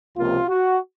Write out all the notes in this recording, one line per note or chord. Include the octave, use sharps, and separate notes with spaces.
C#2 C3 F3 A#3 F4
F#4